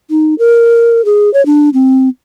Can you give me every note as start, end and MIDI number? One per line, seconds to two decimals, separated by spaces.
0.10 0.34 63
0.39 1.04 70
1.05 1.32 68
1.34 1.44 73
1.46 1.69 62
1.74 2.09 60